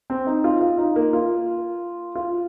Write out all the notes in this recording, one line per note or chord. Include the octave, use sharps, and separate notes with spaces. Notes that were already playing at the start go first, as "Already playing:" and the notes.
C4
D#4
F4
F4
D#4
A#3
F4
F4